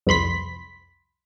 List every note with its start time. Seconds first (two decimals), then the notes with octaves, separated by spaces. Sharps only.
0.07 C2 F2 B5 C6 B6